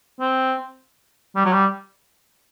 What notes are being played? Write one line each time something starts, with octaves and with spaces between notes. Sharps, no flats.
C4
G3
F#3
G3